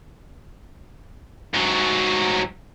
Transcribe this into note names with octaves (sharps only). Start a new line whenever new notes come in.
G#2 F#3